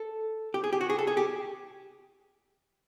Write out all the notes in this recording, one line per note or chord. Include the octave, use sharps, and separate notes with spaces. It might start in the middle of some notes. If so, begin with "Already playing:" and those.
Already playing: A4
G4
G#4
G4
F#4
G#4
A4
G#4
G4